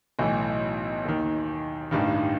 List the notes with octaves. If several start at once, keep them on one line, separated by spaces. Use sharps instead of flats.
B1 A2 E3
D#2 D#3
A1 G2 D#3